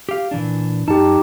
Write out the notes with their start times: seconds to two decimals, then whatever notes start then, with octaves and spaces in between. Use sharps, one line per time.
0.09 G4 F5
0.31 A#2 E3 D4
0.88 F#2 D#4 G4 A5